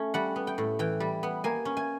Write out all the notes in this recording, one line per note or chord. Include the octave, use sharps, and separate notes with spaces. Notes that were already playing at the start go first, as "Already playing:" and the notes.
Already playing: A3 C#4
G3 F#5
B3
G5
A2
E3 G5
G3
B3
A#3 G#5
C#4
G#5